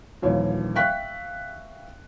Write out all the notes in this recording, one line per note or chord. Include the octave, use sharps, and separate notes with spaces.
D#1 D#2 E3 F3 C#5
E5 F5 G5 C#6 F#6 B6